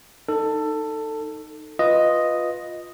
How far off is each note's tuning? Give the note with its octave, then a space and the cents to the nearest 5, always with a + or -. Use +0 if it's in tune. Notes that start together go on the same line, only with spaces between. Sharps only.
D#4 -10 A4 +15
F4 +10 B4 +0 D#5 +0